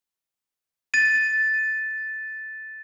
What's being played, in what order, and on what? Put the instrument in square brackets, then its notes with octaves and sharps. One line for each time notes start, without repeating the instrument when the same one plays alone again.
[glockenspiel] A6 D#7